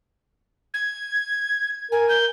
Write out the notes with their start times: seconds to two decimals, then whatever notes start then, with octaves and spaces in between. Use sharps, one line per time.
0.73 G#6
1.91 A#4 G#5
2.08 G6